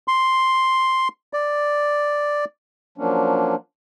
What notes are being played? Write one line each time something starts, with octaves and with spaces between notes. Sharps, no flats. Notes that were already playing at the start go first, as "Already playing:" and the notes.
C6
D5
F3 F#3 A#3 C#4 D4